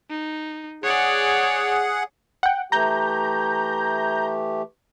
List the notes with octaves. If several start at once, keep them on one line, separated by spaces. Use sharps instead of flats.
D#4
G#4 C#5 D5 F#5
F#5 G5
E3 A3 G4 A#5 G6